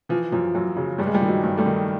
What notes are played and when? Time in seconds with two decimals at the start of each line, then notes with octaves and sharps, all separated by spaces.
0.09 E3 F3
0.32 F#2 F3
0.55 F#2 F#3
0.76 C#3 F#3
0.98 G2 G3
1.06 G#3
1.13 F3 G3
1.22 D#3
1.28 F#3 G#3
1.44 G2
1.58 G3 A3
1.66 D#3